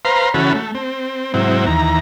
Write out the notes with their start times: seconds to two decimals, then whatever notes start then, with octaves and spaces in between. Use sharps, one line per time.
0.05 B4 C5 F5 A#5 C6
0.34 C#3 E3 C#4 F#4 A4 B5
0.55 A3
0.75 C4
1.34 G#2 C3 F#3 C4 E4
1.66 D#2 E3 A#5